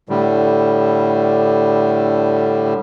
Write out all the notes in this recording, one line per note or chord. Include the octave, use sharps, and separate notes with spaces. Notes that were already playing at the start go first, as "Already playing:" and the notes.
A2 D3 G3